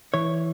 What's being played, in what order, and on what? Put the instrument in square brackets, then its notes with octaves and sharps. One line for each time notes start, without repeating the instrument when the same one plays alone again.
[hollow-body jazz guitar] E3 C#5